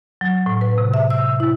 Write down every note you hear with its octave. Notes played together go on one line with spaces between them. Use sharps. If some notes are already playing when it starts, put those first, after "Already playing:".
F#3
A2
B4
C3
E5
E6
E4